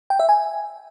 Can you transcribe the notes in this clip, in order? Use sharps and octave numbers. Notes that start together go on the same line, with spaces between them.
G5
E5
G#5